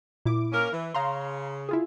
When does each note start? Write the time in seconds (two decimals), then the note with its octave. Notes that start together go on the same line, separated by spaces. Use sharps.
0.26 A#2 E4 D6
0.53 A#3 C#4 A#4
0.72 E3
0.94 C#3 F5 A#5 C6
1.69 E4 F4 G#4